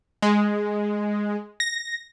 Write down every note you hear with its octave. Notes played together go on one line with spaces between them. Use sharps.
G#3
A#6